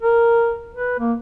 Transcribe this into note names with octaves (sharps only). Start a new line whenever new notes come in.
A#4
B4
A#3